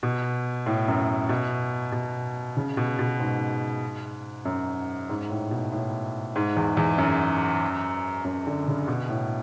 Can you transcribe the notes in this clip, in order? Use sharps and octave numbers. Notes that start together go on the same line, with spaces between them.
B2
A2
F#2
B2
B2
C#3
B2
B2
G#2
F#2
G#2
A2
B2
A2
G#2
E2
E2
F#2
F#2
D3
C#3
B2
A2